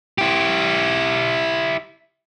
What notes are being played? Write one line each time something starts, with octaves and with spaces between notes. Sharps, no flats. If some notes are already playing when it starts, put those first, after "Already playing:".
E4 G4